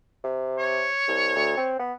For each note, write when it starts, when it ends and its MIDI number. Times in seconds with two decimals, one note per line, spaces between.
0.24 0.86 48
0.59 1.74 73
1.08 1.34 36
1.35 1.54 38
1.57 1.76 60
1.79 1.93 59